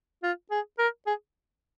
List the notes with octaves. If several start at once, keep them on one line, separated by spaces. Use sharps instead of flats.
F4
G#4
A#4
G#4